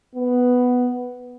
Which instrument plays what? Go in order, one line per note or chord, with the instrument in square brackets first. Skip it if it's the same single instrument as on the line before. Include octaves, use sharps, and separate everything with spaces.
[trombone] B3